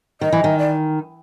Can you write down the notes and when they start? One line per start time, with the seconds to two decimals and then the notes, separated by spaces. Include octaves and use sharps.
0.21 D#3 D#5
0.32 E3
0.44 D#3
0.59 D5